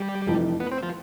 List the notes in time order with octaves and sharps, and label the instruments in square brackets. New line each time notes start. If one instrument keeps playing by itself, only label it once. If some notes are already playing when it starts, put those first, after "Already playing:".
Already playing: [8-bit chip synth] G3 G4
[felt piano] F1 F2 E3
[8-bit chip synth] B3 B4
C4 C5
F3 F4